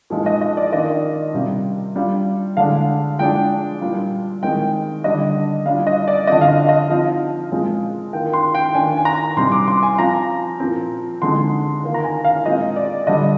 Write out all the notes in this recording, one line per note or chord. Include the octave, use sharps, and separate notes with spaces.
A#2 F3 G#3 D#4
D#5
D#5
D5
D#3 A#3 D4 F4 D#5
D5
C3 G3 C4 F4
G3 D4 F4
D3 G#3 D4 F5
F3 G#3 D4 G5
A#2 G3 D4 F4
D#3 G#3 C4 D#4 G5
D3 G3 D4 D#5
G3 D4 F4 F5
D#5
D5
D3 F3 C4 D#5
F5
D#5
D#5
F3 C4 D#4 F5
A#2 G#3 C4 F4
D#3 A#3 F4 G5
C6
G5
D#3 A#3 D4 F4 G#5
G#5
A#5
C3 G3 C4 D#4 C6
D6
C6
G#5
F3 C4 F4 A#5
A#2 F3 C4
D3 G#3 C4 D#4 C6
D#3 A#3 F4
A#5
G#5
F5
A#2 G#3 C4 D#5
D5
D3 G3 D4 D#5